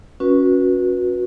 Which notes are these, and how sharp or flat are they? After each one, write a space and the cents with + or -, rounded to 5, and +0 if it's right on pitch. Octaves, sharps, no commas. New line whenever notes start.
C#4 +0 F#4 -20 B4 -30